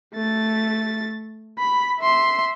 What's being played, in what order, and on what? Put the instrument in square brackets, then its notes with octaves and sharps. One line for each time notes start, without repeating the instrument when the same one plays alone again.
[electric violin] A3 A6
B5
E5 C6